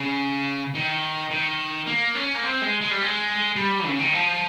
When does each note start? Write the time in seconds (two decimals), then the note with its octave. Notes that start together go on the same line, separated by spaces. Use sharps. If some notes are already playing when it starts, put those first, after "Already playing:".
Already playing: C#3
0.75 D#3
1.30 D#3
1.87 A#3
2.15 C#4
2.35 A#3
2.43 C4
2.61 G#3
2.81 G#3
2.91 G3
3.01 G#3
3.56 G3
3.85 C#3
3.99 D#3
4.12 F3